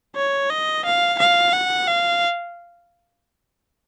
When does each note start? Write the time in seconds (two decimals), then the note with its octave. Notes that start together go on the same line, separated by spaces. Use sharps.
0.16 C#5
0.50 D#5
0.85 F5
1.19 F5
1.53 F#5
1.88 F5